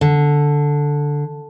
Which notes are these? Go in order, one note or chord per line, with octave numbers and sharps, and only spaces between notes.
D3